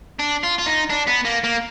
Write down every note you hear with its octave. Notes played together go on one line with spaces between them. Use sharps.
D4
F4
F4
D#4
D4
B3
A#3
A#3